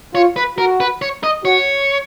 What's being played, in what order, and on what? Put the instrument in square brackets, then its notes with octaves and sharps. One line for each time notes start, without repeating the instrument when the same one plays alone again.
[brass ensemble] F4 [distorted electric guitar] C#5
[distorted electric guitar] B4
[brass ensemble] F#4 [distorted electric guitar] A#4
[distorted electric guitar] B4
C#5
D#5
[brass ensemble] F#4 [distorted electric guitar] C#5